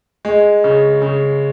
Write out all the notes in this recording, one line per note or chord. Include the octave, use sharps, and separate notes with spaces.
G#3
C#3
C#3